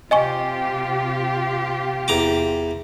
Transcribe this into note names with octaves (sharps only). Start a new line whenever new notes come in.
C3 F4 G4 D#5 G#5 C#6
E2 A#5 D6